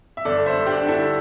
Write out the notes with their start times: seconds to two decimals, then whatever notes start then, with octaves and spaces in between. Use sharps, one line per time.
0.17 E5
0.25 G1 A4 D5
0.46 C5 E5
0.53 G2
0.67 D4 G4
0.81 D3
0.89 E4 A4